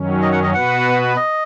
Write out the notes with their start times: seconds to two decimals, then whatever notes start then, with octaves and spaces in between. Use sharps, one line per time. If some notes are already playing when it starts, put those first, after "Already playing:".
Already playing: F#2 D#3 F#3 C#4
0.22 D#5
0.32 F#5
0.43 D#5
0.54 B2 B3 F#4 B4 F#5
1.16 D#5